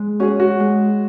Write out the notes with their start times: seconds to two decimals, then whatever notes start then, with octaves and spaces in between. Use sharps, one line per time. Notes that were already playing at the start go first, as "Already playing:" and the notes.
Already playing: G#3
0.20 C#4 F#4 G#4
0.40 F#4
0.60 G#3